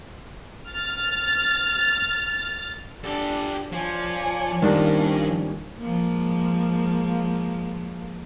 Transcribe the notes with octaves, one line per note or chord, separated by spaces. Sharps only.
F6 A6
D4 G4 A4
F3 C#5 D5 G#5
G2 D#3 F3 G3 A#3 C#4 D4
F3 G#3 A#3